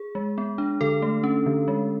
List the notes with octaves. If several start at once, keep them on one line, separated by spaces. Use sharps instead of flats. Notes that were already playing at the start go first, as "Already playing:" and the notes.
Already playing: G#4
G#3
B3
D4
D3 A4
A3
C#4
D3
G#3